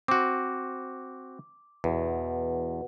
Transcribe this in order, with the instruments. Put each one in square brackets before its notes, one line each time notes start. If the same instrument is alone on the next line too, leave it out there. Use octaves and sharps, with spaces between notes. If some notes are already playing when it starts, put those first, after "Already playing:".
[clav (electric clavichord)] C4 F#4 [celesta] D6
[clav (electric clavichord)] E2 [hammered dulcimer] B2